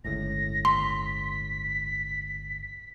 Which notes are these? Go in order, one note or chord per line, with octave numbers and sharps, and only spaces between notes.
G1 C#2 A2 A#6
C6 B6